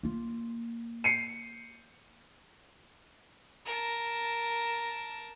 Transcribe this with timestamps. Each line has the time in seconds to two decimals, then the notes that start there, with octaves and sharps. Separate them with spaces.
0.03 A#3 F4
1.04 C7 C#7 D#7
3.65 A#4 A5